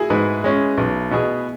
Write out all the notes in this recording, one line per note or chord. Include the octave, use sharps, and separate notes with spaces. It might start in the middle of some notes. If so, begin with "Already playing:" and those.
Already playing: E4 F#4 G#4
G#2 B4
G#3 C#4
B1
B2 B3 G#4